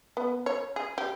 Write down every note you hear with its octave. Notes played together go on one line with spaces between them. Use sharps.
B3
C#5
G#4
G4